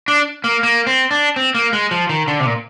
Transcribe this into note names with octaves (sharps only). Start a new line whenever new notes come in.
D4
A#3
A#3
C4
D4
C4
A#3
G#3
F3
D#3
D3
C3
A#2